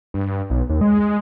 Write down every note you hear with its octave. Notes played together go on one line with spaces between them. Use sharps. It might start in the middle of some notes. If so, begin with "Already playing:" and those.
G2
B1
D#2
G#3